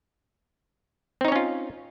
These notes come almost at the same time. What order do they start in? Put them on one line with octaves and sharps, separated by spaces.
C4 D#4 C#5 C#4 F4